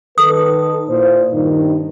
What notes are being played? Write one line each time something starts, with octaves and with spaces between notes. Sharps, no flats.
D#3 A4 B4 D#6
A#2 E4 C5
G2 D#3 D#4